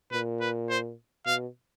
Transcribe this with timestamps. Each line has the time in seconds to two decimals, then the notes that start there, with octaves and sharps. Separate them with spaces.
0.11 A#2 B4
0.41 B4
0.70 C5
1.26 B2 F5